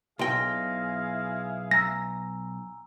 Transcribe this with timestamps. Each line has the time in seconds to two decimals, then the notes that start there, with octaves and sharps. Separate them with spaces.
0.19 B1 E4 G#4 F5 G5 C6 A#6
1.71 G#5 A#5 E6 A#6